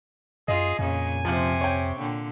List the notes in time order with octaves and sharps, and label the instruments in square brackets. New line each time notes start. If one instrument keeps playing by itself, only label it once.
[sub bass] F#2 [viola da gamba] F4 [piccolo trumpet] G#4 [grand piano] D#5
[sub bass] F2 [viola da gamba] A#2 C#3 [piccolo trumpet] G#5
[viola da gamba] C3 [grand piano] F3
[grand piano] C#5 G5
[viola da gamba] A#2 D3